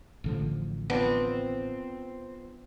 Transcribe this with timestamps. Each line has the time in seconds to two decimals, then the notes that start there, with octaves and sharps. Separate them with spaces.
0.24 A1 D3 F3
0.90 B3 C4 D4 F4